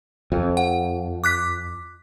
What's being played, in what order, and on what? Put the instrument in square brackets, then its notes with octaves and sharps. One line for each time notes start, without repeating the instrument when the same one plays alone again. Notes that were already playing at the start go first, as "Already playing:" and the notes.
[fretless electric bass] F2
[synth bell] F#5
D6 F#6 B6